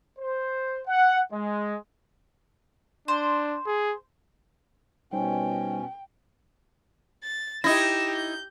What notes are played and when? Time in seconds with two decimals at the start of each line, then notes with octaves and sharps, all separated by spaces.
0.19 C5
0.87 F#5
1.31 G#3
3.08 D4 C5
3.66 G#4
5.13 B2 G3 C#4 D#4 C5 G5
7.23 A6
7.64 D#4 E4 G4 A#6 E7
8.15 G6